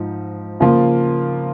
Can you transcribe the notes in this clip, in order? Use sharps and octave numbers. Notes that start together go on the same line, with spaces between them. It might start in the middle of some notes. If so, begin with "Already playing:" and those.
Already playing: G#2 F3 D#4
C#3 F3 A#3 F4